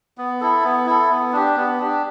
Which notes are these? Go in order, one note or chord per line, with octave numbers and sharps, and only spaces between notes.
B3
E4 A4
B3
E4 A4
B3
D4 G4
B3
D4 G4